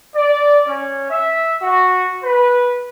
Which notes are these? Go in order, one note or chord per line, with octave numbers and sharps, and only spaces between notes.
D5
C#4
E5
F#4
B4